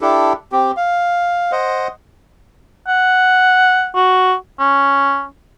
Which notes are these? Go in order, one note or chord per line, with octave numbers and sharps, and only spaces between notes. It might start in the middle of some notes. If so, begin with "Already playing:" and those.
D4 E4 G4 A4
C4 G4
F5
C5 D#5 F#5
F#5
F#4
C#4